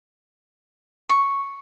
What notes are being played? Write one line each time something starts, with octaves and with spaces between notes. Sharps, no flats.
C#6